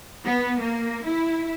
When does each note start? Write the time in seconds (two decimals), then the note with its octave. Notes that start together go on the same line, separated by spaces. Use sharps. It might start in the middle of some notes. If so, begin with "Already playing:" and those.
0.24 B3
0.60 A#3
1.05 E4